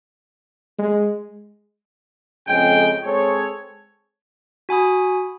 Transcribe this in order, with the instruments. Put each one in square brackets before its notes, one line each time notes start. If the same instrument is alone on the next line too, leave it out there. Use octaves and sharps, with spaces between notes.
[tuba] G#3
[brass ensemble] F2 C#3 G#3 G5
G#3 C4 G#4 A4 C#5
[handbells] F#4 G#5 B5 D#6